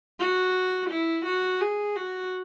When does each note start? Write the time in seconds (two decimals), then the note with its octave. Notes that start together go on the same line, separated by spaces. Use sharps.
0.19 F#4
0.90 E4
1.25 F#4
1.61 G#4
1.96 F#4